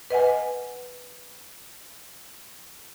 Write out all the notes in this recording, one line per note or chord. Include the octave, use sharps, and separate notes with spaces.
B4 D#5 F#5 G#5